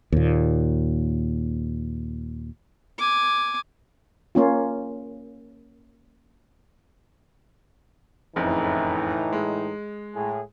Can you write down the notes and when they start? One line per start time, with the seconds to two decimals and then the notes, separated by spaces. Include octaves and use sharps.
0.12 D#2 A#2
2.98 G#5 D6
4.35 A#3 C#4 F4
8.36 F#1 F2 A2 C#3 E3 D#4
9.33 G#3
10.15 A2 G#4